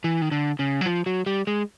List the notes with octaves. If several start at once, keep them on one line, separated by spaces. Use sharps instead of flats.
E3
D#3
D3
C#3
F#3
F3
F#3
G3
G#3